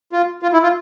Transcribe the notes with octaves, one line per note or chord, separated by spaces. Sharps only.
F4
F4
E4
F4